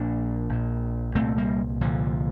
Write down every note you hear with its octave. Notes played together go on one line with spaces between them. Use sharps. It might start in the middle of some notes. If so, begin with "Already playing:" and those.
Already playing: A#1 A#2 A#3 D4
A#1 A#2
C2 A#2 A3 C4
G3 A#3
C2 A#2 D3 F3